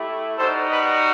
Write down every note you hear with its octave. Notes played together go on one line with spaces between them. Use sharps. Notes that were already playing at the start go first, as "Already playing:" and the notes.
Already playing: A3 E4 G4
G3 D#4 F#4 A4 C5
B4 D#5